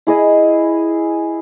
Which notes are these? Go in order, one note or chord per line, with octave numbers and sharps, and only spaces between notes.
E4 G#4 D#5